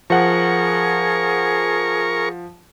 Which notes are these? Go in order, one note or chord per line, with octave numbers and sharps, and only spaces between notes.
F3 G#4 A#4 F#5 C#6